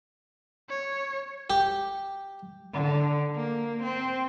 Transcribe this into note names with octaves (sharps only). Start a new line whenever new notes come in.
C#5
G4
D3
A#3
C4